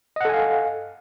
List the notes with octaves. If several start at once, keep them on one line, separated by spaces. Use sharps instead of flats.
A4 D#5 F5 F#5 G#5